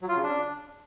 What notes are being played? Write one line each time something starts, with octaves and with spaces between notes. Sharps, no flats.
F#3
F4
C#3
D4